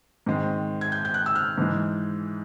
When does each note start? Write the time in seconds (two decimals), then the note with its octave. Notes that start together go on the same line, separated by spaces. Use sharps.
0.26 G#2 D#3 G#3 C4
0.81 G#6
0.92 G6
1.05 G6
1.14 F#6
1.26 E6
1.36 F6
1.58 G#2 E3 G#3